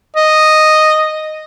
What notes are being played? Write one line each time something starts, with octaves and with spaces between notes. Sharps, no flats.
D#5